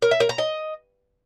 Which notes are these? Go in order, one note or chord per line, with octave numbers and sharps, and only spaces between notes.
A#4
E5
A#4
A#5
D#5